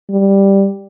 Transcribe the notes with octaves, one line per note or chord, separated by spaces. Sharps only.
G3